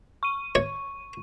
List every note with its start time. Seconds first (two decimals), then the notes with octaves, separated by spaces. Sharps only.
0.23 C#6 D#7
0.55 C#5